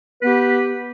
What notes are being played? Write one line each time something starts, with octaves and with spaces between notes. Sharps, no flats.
B3 G4 B4